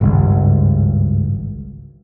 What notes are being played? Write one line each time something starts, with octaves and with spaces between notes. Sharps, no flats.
G#1 C#2 G2